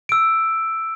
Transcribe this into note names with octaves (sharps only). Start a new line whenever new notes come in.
E6 D7